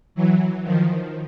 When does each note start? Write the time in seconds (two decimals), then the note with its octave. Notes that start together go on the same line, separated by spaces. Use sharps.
0.15 E3 F#3
0.63 D#3 F3